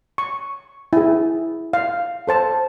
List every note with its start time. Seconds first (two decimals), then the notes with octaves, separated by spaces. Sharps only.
0.18 C#6
0.93 E4 G#4
1.73 F5
2.27 A4 C5 A5